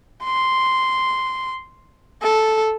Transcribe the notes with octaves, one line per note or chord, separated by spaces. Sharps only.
C6
A4